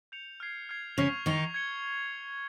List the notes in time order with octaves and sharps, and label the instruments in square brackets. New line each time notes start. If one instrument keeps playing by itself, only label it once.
[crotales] G6 C#7 F7
F6 G#6 C7
F6 G#6 C7
[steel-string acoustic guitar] C#3 C#4 [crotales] C#6 F6 C7 F7
[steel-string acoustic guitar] D#3 D#4 [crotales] C#6 F6 C7 F7
[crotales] G#6 C#7 G7